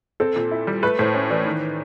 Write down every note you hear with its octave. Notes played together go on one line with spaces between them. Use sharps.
C4 A4
A#2
E4
G3
A3 B4
A2 C5
C#4
E3 D5
D#3